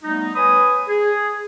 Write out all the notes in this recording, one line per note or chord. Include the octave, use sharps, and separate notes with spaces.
G3 A3 B3 D#4
B4 C#5 G#5 B5 D#6
G#4